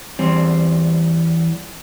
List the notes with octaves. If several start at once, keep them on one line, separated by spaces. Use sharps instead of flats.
E2 G3 C4